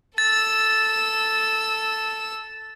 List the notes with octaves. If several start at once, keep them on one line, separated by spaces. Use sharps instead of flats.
A4 E6 A6